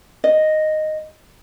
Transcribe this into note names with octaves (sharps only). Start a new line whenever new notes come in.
D#5